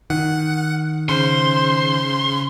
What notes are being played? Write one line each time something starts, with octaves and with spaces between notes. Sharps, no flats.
D#3 F#5
C#3 C5 C6